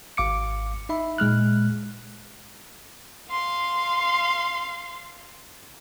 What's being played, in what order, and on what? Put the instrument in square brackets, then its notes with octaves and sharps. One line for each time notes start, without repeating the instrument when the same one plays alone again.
[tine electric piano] G#1 F5 D6 C#7
D#4 E5 B5
A#2 G#3 F6 F#6
[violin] F5 C6